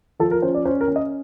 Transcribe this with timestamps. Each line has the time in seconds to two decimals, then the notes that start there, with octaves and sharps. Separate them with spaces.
0.19 F3 A4
0.31 A#4
0.42 C#4 C5
0.54 D5
0.65 C#4 C5
0.81 A#4
0.88 C#4
0.96 D#5